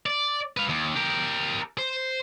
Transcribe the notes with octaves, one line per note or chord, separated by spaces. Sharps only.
D5
B4 F5
D#2
G4 A#4
C5